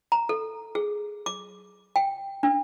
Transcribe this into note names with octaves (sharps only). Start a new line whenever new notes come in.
A#5
A4
G#4
D6
G5
D4